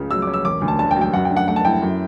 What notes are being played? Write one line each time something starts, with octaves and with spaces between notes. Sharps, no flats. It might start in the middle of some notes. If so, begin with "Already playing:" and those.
Already playing: C#2 C#3
F#3 E6
D6
C#4
E6
E1 D6
D2
A5
D3 A5
G5
F#3
G5
F#2 F#5
G5
D3
F#5
A3 F#5
A5
E4 G5
F#2